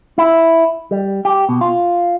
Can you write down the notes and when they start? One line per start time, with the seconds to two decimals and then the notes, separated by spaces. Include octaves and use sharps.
0.18 E4
0.91 G3
1.25 G4
1.49 B2
1.61 F4